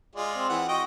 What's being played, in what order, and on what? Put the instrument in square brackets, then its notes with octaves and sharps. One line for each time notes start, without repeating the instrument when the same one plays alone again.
[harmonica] G#3 F4 D5
[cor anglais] C4
[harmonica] E3 F#5
[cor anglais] F#4 [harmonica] D#5 G5